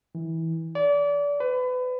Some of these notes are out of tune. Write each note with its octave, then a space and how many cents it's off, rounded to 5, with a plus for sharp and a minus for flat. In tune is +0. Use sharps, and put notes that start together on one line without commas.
E3 -20
D5 -30
B4 +30